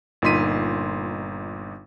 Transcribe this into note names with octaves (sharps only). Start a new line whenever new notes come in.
G1 A#2 D#4 C6 B6 D#7